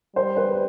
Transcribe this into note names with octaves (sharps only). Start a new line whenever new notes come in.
G3 C5
B4